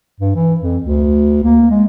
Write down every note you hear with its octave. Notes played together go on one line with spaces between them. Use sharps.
G2
E3
F2
D2
A#3
G#3